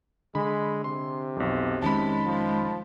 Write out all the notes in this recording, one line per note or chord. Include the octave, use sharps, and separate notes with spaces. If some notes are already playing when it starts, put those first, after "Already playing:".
D3 G#3 B5
C3 C6
B1 F2
F1 D#3 G#3 C#4 A5 B5
F3